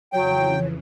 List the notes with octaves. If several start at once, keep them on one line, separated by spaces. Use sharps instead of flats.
F2 C#3 E3 F#3 C#5 G5